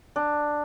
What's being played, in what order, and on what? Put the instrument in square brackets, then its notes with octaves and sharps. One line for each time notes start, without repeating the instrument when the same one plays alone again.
[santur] D4